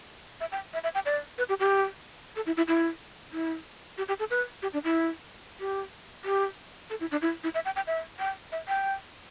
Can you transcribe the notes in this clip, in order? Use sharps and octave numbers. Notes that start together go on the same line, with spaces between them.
E5
G5
E5
E5
G5
D5
B4
G4
G4
A4
E4
E4
E4
E4
G4
G4
A4
B4
G4
D4
E4
G4
G4
A4
E4
D4
E4
E4
E5
G5
G5
E5
G5
E5
G5